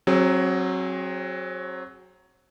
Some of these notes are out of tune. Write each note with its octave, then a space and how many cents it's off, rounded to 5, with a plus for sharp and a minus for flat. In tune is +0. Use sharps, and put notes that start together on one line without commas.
F#3 +5 C4 +35 G#4 +0